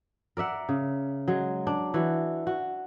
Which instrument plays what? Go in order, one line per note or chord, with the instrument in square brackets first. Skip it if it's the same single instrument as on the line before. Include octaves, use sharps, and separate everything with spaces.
[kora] A#4 D5 E5 F#5
C#3
F#3 G#3
D4
E3 F#4
F#4